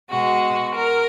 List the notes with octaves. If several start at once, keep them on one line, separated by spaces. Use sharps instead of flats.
B2 G#3 F#4
A#4